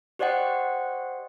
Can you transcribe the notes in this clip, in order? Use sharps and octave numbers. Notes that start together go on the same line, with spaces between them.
G4 C5 D5 D#5 F#5 G5